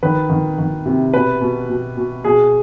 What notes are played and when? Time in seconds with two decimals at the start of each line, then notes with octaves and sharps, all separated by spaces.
0.03 D#3 B4
0.30 D#3
0.58 D#3
0.85 C3
1.14 B2 B4
1.41 B2
1.69 B2
1.97 B2
2.24 B2 G#4